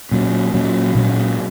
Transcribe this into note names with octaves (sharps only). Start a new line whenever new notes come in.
A#2 F#3 C#4
A#2 F#3 C#4
A#2 F#3 C#4